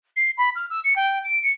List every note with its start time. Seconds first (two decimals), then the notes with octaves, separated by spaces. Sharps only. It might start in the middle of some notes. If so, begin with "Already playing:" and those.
0.17 C7
0.38 B5
0.56 F6
0.70 E6
0.84 C#7
0.96 G5
1.25 D7
1.43 C#7